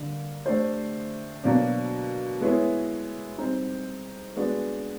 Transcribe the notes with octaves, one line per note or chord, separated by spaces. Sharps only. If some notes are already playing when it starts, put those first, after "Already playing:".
Already playing: D3 G3 A#3 D4
A3 D4 G4 C5
B2 F#3 A#3 D4
G#3 B3 E4 G#4 C#5
G3 C4 D#4 G4
G#3 B3 D4 F#4